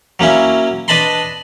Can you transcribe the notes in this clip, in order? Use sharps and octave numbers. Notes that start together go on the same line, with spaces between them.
F#3 A#3 C#4 E4
D4 B4 D#5 A5 B5 C6